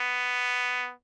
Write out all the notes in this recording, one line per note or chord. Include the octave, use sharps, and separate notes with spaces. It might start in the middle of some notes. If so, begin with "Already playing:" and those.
Already playing: B3